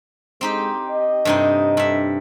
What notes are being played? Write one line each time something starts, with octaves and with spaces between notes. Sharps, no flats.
G#3 C4 D#4 G4
D#5
G2 C3 D#4
G2 E5